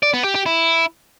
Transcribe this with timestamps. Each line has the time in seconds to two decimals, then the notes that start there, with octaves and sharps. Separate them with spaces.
0.03 D5
0.14 B3
0.24 G4
0.35 G4
0.46 E4